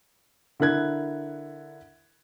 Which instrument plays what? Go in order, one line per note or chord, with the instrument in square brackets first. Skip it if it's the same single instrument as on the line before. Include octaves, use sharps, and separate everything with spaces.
[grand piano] D3 E4 A#4 F#6 G#6